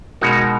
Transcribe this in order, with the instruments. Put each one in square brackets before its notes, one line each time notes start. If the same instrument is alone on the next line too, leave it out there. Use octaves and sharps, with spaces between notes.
[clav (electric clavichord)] B2 G#3 D#4 F#4 A#4